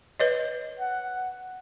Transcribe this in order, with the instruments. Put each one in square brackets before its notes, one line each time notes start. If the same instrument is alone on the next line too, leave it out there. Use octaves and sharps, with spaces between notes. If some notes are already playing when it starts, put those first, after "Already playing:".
[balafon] B4 C#5 D#5
[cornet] F#5